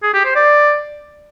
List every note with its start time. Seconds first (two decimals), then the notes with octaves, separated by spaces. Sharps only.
0.03 G#4
0.14 G4
0.25 C5
0.36 D5